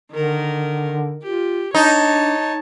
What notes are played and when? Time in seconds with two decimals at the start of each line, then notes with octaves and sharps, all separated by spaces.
0.12 D3 D#3 A#4
1.24 F4 G4
1.75 D4 D#4 C#5 A5